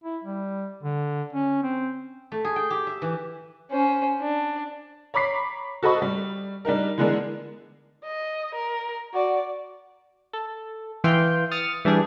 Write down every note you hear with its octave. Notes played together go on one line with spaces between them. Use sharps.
E4
G3
D3
C#4
C4
A3
G#4
G5
G4
E5
E3
C#4 C5
D4
C#5 A#5 B5 D6 B6 C7
F#4 A4 C5 D#5 B5 C#6
G3
G3 D4 D#4 A#4
D3 E3 G#3 B3 D4 A#4
D#5
A#4
F#4 D5
A4
E3 F5 G5 C6
D#6 F6 A6 C#7
E3 G3 D4 G#4